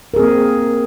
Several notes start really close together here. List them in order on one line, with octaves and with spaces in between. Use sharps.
A#4 G#4 C4 A#3